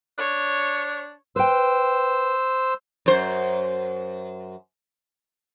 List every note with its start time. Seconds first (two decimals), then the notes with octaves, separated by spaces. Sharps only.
0.18 D4 C#5
1.36 B4 C5 G5 E6
3.06 F#2 C5